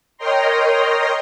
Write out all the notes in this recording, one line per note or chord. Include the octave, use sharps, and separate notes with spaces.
A#4 C#5 D#5 G5 A#5 C6